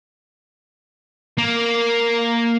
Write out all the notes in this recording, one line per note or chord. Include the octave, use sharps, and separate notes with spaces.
A#3